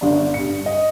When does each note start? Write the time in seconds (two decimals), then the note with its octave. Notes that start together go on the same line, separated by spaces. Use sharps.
0.01 G1 D4
0.34 G2 C#7
0.66 D#5